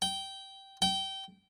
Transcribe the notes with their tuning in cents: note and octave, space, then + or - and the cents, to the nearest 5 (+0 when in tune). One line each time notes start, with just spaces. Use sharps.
G5 -10
G5 -20